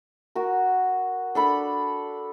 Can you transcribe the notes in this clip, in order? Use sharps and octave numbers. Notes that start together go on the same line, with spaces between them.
F#4 A#4
D4 A4 B5